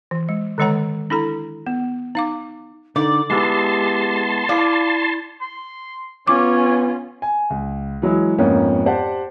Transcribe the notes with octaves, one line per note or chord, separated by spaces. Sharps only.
E3
G#3
D3 D#3 G#3 C#5 F#5 A#5
D4 E4 A4 A#5
B3
D#4 F5 D6
D3 D#4 D5
G#3 B3 E4 G4 A5 C6
E4 F4 D5
C6
B3 C#4 F4 C#5 D6
G#5
C#2
E3 F#3 G#3
F2 G#2 A#3 B3 C#4
G4 C5 D5 F#5 A5